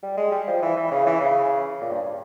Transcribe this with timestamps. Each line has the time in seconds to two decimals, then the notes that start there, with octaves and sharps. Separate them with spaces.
0.03 G3
0.17 G#3
0.32 G3
0.47 F3
0.62 E3
0.77 E3
0.91 C#3
1.06 E3
1.21 C#3
1.81 A#2
1.91 G2